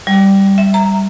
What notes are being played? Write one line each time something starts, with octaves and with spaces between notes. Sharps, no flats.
G3
E5
A#5